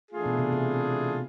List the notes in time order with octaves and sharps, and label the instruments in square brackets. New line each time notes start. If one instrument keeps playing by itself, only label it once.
[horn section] E3 A3 D4 F4 G#4
[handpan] B2
C3
C3